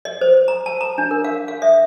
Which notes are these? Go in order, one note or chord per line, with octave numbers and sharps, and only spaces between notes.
D#5
C5
A#5
A5
A#5
D4
A#4
F5
F5
E5